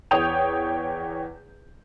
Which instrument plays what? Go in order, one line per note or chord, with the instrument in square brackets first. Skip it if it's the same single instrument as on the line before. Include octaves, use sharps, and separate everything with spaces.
[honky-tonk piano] E2 C#5 G5 D#6 G6 F7